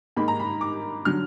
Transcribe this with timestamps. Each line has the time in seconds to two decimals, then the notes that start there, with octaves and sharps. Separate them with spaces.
0.16 G#2 D#3 A#3 D#4 B5
0.28 A#5
0.39 B5
0.61 D6
1.05 D3 F#3 F6